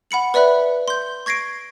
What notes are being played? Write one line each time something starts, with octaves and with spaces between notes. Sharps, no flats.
F#5 B5 C#7 F#7
B4 D5 E5 B5 F#6
C6 G6
C#6 G#6 A#6 C7 D7